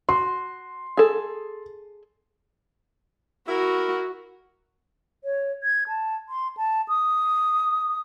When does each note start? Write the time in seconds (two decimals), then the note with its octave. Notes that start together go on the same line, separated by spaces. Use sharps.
0.09 F#4 C6
0.97 G#4 A4
3.49 E4 F#4 A#4
5.24 C#5
5.63 G#6
5.88 A5
6.29 C6
6.57 A5
6.88 D#6